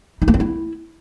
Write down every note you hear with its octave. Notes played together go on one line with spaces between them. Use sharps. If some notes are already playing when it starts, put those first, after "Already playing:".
D#4
A#3
C4
E4